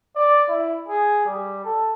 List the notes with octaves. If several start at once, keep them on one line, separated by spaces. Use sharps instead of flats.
D5
E4
G#4
G3
A4